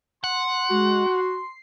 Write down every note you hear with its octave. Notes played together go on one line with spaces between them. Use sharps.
F#5 C6
G#3 F#4
C7